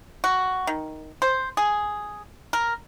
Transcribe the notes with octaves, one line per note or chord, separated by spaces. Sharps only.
F#4
D#3
C5
G#4
A#4